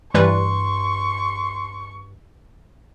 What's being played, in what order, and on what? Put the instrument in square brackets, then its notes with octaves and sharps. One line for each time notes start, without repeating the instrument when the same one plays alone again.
[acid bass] G2 [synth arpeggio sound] E3 G3 B4 [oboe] C6 [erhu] C#6